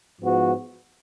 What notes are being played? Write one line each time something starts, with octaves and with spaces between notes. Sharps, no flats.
G#2 F3 B3 F#4